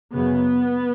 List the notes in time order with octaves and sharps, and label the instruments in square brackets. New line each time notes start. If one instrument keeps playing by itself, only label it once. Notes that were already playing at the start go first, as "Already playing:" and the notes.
[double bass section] F#2 C#3 B3